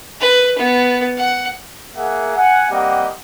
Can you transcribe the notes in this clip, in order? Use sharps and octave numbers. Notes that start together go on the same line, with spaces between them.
B4
B3
F#5
A#3 G#4 E5 F#5
F#5 G#5
G3 A#3 C4 G4 D#5 F#5